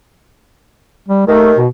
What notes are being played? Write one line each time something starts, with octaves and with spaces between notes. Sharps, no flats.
G3
D#2 D#3 A3
B2